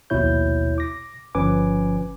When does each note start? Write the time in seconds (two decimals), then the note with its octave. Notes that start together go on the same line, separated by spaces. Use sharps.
0.10 A#1 D#2 B2 E4 C#5 G6
0.78 D6 A#6
1.35 G1 F3 C#4 B4 G#5 D6